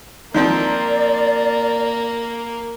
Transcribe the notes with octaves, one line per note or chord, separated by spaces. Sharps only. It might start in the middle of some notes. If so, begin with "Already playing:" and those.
D#3 F3 A#3 C4 D5